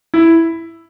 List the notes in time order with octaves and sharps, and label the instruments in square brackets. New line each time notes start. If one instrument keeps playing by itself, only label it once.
[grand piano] E4